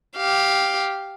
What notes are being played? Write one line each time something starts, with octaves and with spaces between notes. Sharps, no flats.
G4 F5